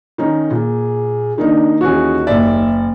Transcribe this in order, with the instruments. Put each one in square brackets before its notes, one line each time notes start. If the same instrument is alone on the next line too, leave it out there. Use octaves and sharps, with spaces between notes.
[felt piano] D#3 C#4 D#4
[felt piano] A#2 [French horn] G#4
[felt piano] D#3 A#3 D#4 [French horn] D4
[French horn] D#2 [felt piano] E3 C#4 G#4 [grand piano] F#4
[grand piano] F#1 D5 [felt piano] E5